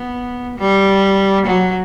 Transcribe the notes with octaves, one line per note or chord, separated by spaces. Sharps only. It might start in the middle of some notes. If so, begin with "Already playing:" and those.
Already playing: B3
G3
F#3